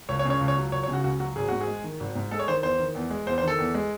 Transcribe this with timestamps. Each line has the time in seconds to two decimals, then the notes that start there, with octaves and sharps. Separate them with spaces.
0.09 C#2 C#5
0.19 C#5
0.25 C#3
0.30 C#5
0.41 C#2
0.48 C#5
0.57 F#3
0.72 C#2 C#5
0.83 C#5
0.88 C#3
0.93 F#4
1.04 C#2 F#4
1.20 F#3 F#4
1.36 G#1 G#4
1.49 G#2 F#4
1.61 G#4
1.67 G#3
1.84 D#3
2.00 G#1
2.15 G#2
2.31 G#3 A4
2.39 C#5
2.48 D#3 C5
2.63 E2 C5
2.80 D#3
2.95 E2
3.10 G#3
3.26 E2 C5
3.38 C5
3.42 D#3
3.48 A4
3.59 E2
3.75 G#3